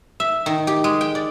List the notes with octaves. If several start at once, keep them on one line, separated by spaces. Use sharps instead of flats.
E5
D#3
G4
G#3
G5
D5